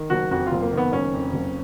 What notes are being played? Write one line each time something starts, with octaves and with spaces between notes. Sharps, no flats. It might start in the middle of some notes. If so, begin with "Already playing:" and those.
Already playing: D#3
F#1 F#4
F2 F#4
F4
F#1
A#3
D#3 B3
F#1 C#4
F2
F#1